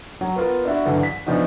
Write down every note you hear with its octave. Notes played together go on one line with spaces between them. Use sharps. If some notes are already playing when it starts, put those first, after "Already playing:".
F#3
B3 F4 A#4
D4 E4 F#4
G2 D3 E3 F#3
B6
B2 E3 F3 D4 D#4 F#4